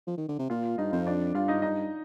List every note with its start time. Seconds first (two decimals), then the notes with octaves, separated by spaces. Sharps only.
0.07 F3
0.18 D#3
0.29 D3
0.39 C3
0.50 A#2 F4 F5
0.78 G2 D#4 D#5
0.92 F2 C4 C5
1.06 D4 D5
1.35 G2 F4 F5
1.48 D#4 D#5
1.62 D#4 D#5